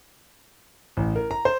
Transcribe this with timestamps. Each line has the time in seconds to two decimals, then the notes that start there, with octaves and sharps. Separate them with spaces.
0.97 A1
1.16 A#4
1.31 A#5
1.45 C5